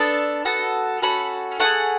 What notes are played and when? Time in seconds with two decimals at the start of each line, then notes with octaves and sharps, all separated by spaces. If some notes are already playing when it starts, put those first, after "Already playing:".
Already playing: B3 D4 A4 A5
0.45 B3 F#4 A4
1.02 C#4 F#4 A4 B5
1.60 A3 E4 G#4 F#5